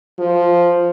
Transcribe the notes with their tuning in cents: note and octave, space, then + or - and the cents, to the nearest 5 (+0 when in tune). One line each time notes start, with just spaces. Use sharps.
F3 -5